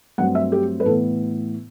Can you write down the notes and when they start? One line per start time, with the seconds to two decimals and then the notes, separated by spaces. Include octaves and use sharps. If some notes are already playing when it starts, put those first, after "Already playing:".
0.18 G2 F#3 A3 C4 F#5
0.35 E5
0.52 G4
0.80 B4
0.85 A2 E3 B3 A4